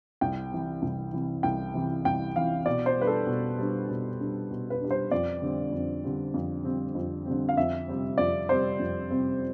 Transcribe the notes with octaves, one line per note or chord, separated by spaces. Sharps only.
C2 G5
C3 E3
C2
C3 E3
C2 G5
C3 E3
C2 G5
C3 E3 F5
B2 D5
C5
G3 D4 B4
A4
B2
G3 D4
B2
G3 D4
B2
B4
G3 D4
C5
F2 D5
D3 G3 C4
F2
D3 G3 C4
F2
D3 G3 C4
F2
D3 G3 C4
F5
F2 E5
C3 G3 C4
F2 D5
C3 G3 C4 C5
F2
C3 G3 C4